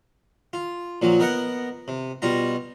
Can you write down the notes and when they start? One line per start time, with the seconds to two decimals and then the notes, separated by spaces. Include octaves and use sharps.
0.53 F4
1.02 A#2 F3 F#3
1.20 B3 A#4 D#5 F#5
1.88 C3
2.22 B2 G3 F4 A#5